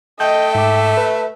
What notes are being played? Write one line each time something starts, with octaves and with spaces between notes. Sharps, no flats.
A3 D#5 G5 G6
G#2 E5 D6
B4